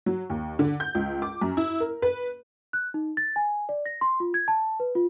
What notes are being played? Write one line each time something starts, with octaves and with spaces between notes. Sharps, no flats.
F#3
D#2
D3
G6
C#2
D6
F#2
E4
A#4
B4
F#6
D#4
A6
G#5
D5
A#6
C6
F4
G#6
A5
B4
F4